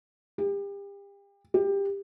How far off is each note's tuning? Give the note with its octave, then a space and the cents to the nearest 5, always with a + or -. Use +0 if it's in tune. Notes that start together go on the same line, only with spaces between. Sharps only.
G4 +35
G4 +20